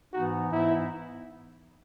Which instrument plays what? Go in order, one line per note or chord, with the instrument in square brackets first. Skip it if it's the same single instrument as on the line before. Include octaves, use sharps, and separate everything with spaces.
[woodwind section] G#2 E3 B3 D#4 [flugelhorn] F#4
[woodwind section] G#2 E3 B3 D#4 [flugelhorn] E4